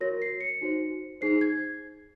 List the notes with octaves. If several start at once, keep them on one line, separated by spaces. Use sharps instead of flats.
F#4 A#4 C#5 A#6
C7
C#7
D#4 F#4 C5
D#4 G#4 C5 C7
G#6